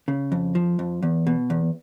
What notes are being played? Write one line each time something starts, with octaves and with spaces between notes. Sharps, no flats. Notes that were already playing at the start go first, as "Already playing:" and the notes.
C#3
F2
F3
F2
E2
B2
E2